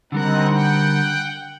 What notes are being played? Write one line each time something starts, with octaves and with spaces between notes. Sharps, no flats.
D3 G3 C4 D#4 A#4 F#5
F#5 G5